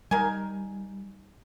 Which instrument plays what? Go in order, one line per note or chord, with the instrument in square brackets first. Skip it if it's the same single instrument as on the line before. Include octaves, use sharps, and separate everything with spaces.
[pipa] D#3 A#4 G#5 [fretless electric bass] G3